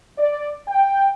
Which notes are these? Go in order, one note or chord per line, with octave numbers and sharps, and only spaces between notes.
D5
G5